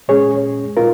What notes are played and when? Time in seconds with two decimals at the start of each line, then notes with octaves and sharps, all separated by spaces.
0.08 A#2 G#3 C#4 G#4 C#5
0.77 A#2 G#3 D#4 F4 A#4